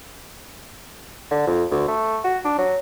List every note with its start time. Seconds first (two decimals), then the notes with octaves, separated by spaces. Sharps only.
1.31 D3
1.47 F2
1.71 D2
1.88 A3
2.24 F#4
2.44 D4
2.58 F#3